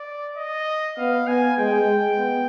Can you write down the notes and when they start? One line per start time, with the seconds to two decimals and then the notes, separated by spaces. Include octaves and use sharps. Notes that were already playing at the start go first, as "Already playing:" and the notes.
Already playing: D5
0.37 D#5
0.97 B3 F5
1.28 B3 G#5
1.57 G#3 G5
1.88 G#3
2.18 B3